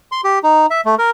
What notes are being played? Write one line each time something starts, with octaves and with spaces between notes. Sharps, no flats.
C6
G4
D#4
E5
A3
A#4